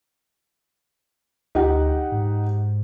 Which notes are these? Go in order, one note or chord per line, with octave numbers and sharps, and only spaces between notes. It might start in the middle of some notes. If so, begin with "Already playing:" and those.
D2 D#4 G4 F#5
G#2